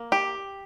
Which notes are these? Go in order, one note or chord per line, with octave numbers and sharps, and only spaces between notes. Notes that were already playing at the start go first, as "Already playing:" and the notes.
Already playing: A#3
G4